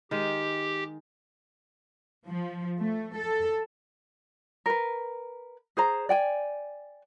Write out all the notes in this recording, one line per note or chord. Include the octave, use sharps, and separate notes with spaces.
D#3 G#3 G4
F3
A3
A4
A#4 B4
G#4 C5 A#5
D5 G5 G#5